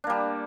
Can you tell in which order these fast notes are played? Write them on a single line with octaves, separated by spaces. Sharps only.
D4 A#3 G3